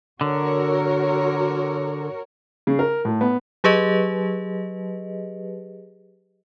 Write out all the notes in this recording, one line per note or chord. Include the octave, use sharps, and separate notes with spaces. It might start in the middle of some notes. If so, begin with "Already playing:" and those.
D3 F#4 A#4 C#5
C#3
A#4
A2
B3
F#3 G4 G#4 B4 D#5